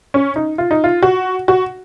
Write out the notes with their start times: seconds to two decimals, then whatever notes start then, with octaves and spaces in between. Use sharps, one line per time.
0.14 C#4
0.36 D#4
0.58 F4
0.71 D#4
0.84 F4
1.03 F#4
1.48 F#4